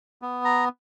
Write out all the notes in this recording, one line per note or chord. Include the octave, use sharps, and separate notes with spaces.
B3
A#5